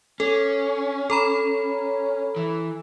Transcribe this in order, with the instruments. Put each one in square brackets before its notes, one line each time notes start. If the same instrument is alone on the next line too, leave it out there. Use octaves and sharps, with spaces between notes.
[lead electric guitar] C#4 [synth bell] A4
[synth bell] A4 A#5 B5
[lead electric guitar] E3